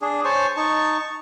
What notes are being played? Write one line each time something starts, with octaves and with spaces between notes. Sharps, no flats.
D4 G#4
C5 C#5 G#5 A5
D#4 A5 C#6